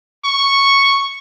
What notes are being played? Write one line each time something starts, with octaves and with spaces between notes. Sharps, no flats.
C#6